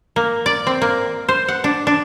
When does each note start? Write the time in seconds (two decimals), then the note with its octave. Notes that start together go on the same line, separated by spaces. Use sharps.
0.16 A#3
0.46 D5
0.67 C4
0.82 A#3
1.28 C5
1.48 F#5
1.64 D4
1.87 D4